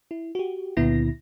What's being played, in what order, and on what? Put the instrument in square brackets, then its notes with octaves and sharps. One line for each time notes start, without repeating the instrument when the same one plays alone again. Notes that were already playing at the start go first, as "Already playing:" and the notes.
[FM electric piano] E4
F#4 G4
C#2 A#2 D3 B3 E4 A#6